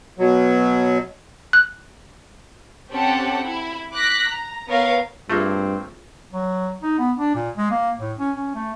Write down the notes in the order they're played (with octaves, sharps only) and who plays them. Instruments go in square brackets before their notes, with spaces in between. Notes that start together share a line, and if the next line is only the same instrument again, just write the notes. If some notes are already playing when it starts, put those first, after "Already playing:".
[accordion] B2 F#3
[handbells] F#6
[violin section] C4 C#4 G4 A4 F#5
E4
D6 F#6 A#6 B6
A#5
B3 A#4 C#5 F5 A#5
[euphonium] G2 [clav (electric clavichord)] A3 A#3 [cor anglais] C4 [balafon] F4 G#4 E5
[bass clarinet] F#3
D#4
B3
D4
A#2
G#3
A#3
A2
C#4
C#4
A3